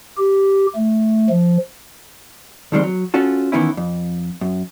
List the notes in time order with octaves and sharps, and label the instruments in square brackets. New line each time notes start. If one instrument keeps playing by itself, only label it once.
[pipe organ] G4
A3
F3
[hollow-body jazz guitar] B1 F2 D#3 G3 G#3 C4
F#3
C#4 F4 F#4 A4
D#3 E3 B3 C#4 E4
F2
F#2